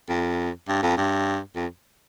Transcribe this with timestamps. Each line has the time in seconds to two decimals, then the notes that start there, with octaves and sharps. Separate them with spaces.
0.09 F2
0.68 G2
0.82 F2
0.97 G2
1.56 F2